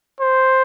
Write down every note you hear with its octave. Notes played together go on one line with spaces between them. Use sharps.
C5